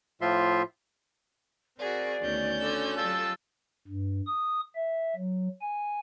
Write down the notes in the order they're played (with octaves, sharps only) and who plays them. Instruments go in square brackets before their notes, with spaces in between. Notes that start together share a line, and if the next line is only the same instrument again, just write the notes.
[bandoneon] A2 F3 F4 E5 C6
[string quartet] C4 A#4 [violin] F#4 G#4 [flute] D5
[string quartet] D2 B2 D#3 [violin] C#4 G6
[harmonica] D3 [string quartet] F#4 A4 E6
[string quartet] F#3 G4 [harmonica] F4 A5 E6
[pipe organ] G2
D#6
E5
F#3
G#5